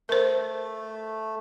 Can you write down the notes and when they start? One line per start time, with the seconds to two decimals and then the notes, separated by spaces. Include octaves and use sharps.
0.09 A3 A#4 C5